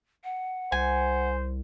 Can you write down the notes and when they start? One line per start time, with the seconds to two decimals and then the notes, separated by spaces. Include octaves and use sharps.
0.24 F#5
0.72 C2 C5 G#5